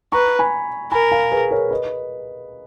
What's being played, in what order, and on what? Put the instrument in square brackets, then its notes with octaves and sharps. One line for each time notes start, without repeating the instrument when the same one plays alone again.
[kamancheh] B4 [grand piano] A#5 C#6
[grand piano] G#5 B5
[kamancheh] A#4 [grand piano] G#5 B5
[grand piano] F5 G#5
G#4 B4
A#4 C#5
B4 D#5